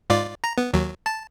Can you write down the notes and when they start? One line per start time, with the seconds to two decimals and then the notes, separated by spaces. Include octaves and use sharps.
0.10 G#2 F4 D5
0.44 A#5
0.58 B3
0.73 D#2 F#3
1.06 A5